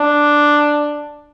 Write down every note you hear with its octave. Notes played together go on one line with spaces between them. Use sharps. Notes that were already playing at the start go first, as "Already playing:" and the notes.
Already playing: D4